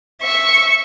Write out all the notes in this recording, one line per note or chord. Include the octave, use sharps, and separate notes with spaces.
E5 C#6